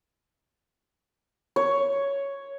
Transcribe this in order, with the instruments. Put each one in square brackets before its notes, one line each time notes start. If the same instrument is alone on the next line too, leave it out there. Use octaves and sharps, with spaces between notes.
[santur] C#5